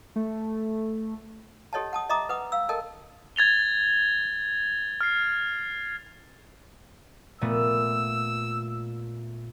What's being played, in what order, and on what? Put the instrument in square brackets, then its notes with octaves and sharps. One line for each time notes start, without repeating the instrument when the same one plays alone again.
[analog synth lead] A3
[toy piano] G4 A4 C#5 D#5 F#5 A5
F#5 A5 D#6
D#5 E5 A#5 D6 D#6
B4 F#5 D#6
F5 E6
A4 A#4 D#5 G5 A5
[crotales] G#6 A6 F7 G7
F6 C7
[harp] A#2 A3 B3 [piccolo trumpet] E6